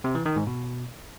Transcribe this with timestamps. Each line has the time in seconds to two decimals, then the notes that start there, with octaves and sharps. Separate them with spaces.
0.04 C3
0.15 E3
0.26 D#3
0.36 G#2
0.47 B2